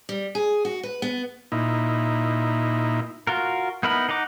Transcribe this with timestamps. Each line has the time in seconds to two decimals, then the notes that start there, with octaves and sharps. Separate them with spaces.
0.09 G3
0.35 G#4
0.65 F#4
0.83 B4
1.02 B3
1.52 A#2 D#4 E4
3.27 F4 F#4 A#4
3.83 B3 D#4 E4 A#4 B5
4.09 D#4 F#5 A#5 D6